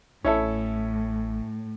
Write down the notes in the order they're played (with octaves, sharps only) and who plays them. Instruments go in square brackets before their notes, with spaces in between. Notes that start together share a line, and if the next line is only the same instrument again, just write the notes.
[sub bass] A1 [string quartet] A2 [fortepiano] C#4 E4 A4